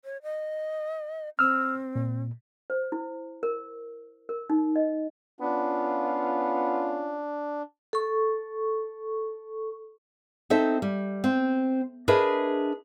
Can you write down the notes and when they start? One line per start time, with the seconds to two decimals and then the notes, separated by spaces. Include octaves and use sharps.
0.05 C#5
0.23 D#5
1.39 C4 E6 F6
1.96 A#2
2.70 C5
2.92 E4
3.43 A#4
4.29 A#4
4.50 D#4
4.76 D#5
5.41 B3 C#4 D4 F4
7.93 A4 C#6
10.50 C4 D#4 A4 E5
10.82 G3
11.24 C4
12.08 D4 G#4 A#4 B4 D#5 E5